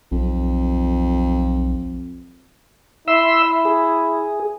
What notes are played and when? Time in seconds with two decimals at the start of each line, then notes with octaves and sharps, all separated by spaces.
0.12 B1 F2
3.08 E4 E5 C6 E6
3.65 G#4